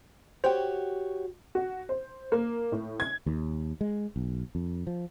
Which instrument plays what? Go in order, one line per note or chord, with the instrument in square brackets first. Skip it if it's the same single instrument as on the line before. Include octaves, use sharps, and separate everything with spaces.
[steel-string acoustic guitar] F#4 G4 C#5 [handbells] C5 G5
[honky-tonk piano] F#4
C5
A#3
A2
G#6
[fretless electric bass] D#2
G#3
B1
F2
F3